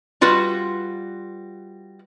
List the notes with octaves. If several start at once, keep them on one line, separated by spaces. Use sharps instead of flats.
G3 F4 F#4 B4